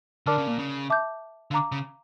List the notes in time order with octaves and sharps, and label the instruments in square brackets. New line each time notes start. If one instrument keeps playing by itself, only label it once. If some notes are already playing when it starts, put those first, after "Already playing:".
[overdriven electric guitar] D3 [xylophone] A#4 D5 A5 D6 F6
[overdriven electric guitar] C#3
A#2
C#3
[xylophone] E5 A5 D6 G6
[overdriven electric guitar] D3 [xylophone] F5 A#5 D6
[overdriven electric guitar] C#3